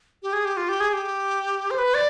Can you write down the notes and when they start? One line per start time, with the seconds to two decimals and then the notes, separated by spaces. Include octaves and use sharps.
0.23 G4
0.33 G#4
0.45 G4
0.57 F4
0.69 G4
0.80 G#4
0.93 G4
1.71 C5
1.78 B4
1.94 D5